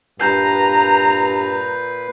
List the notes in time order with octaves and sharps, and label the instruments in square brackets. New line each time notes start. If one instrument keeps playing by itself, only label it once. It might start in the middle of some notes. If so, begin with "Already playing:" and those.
[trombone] G2 [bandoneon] A#2 B4 [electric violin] A#5 [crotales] G6 C7